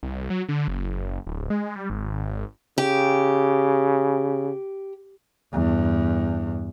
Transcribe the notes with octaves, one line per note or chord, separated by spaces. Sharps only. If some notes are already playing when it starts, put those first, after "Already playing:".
C2
F#3
D3
F#1
D1
G#3
G3
G#1
C#3 G4
E2 G2